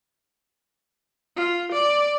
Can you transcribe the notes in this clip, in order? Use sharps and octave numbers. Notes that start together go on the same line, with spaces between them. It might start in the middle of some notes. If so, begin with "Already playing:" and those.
F4
D5